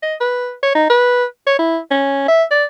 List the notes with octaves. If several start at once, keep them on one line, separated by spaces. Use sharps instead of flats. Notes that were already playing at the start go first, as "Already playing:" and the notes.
D#5
B4
C#5
D#4
B4
C#5
E4
C#4
E5
D5